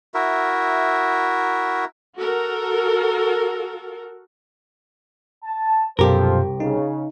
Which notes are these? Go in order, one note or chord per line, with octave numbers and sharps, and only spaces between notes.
E4 F#4 A#4 E5
F#4 A4 A#4
A5
C2 F#2 B2 F3 G4 A4 A#4 C5
C#3 D#4